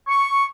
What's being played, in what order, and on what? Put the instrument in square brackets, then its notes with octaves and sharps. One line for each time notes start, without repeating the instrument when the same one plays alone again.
[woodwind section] C#6